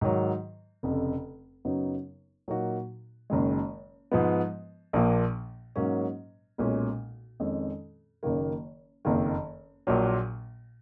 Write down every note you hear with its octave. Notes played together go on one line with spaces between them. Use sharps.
G#2 D#3 F#3
F1 F2 C#3
F#2 C#3 F#3 B3 D#4
A#2 F#3 A#3 D#4 F#4
F#1 F#2 D#3 G#3
G#2 F3 G#3 B3
A#1 A#2 F3 A#3
G#2 F#3 A#3 C#4
B1 A#2 G#3 C#4
F2 D#3 G#3 C#4
F#1 F#2 D#3 A#3
F#1 F2 D#3 A#3
A#1 A#2 F#3